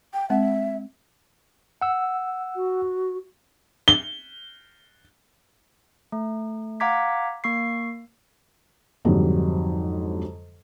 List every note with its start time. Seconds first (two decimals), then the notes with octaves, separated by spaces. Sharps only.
0.14 G5
0.30 G#3 C4 E5 F#5
1.81 F#5 E6
2.56 F#4
3.88 G7
6.12 A3
6.80 F5 F#5 A#5 D6 G#6 B6
7.44 A#3 C#6 C7
9.05 F2 G#2 D3 F#3 G3